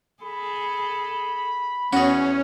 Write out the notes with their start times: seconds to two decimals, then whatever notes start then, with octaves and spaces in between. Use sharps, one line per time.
0.23 G#4 A4 B5
1.93 E2 C#4 F#4 G#4